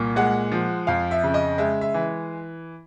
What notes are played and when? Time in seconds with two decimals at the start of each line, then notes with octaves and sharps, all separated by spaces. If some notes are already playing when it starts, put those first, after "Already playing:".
Already playing: C2 A#2
0.16 G#3 F#5
0.52 F3
0.87 F2 F5
1.11 E5
1.24 C#3
1.34 D#5
1.58 G#3 E5
1.81 E5
1.94 E3